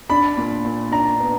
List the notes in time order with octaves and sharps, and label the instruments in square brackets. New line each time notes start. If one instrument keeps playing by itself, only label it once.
[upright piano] D4 [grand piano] B5
[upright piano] A#2
A#2
[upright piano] D4 [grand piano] A#5
[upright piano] B3